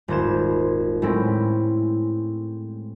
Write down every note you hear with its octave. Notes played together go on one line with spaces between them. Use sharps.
D#1 G#1 C5 G#6 E7
A2 G#3 C4 C#4 E4